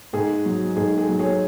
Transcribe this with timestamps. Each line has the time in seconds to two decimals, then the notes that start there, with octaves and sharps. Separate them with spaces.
0.13 G#2 G#4
0.46 F#3
0.76 G#2 G#4
0.98 G#4
1.09 F#3
1.19 G#4 C#5